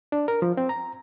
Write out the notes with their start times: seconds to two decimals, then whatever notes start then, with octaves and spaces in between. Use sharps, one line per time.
0.12 D4
0.28 A#4
0.42 F3
0.57 C4
0.69 A#5